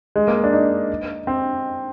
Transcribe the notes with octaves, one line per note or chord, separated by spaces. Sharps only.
G#3
A#3
D4
D#4
C4